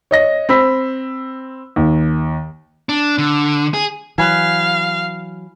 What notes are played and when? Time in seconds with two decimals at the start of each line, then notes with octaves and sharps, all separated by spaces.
0.11 C#5 D#5 A#6
0.49 C4 B5 E6 B6
1.76 D#2
2.89 D4
3.18 D3
3.74 G#4
4.18 E3 F#3 F5 G#5 B5 F#6